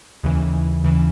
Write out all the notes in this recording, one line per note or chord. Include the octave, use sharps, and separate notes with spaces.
D#2 C#3 E3
D#2 C#3 E3